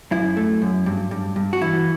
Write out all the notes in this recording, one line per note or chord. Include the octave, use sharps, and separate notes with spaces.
F#2 E4
A3
F#2
G2
G2
G2
F#4
E3 E4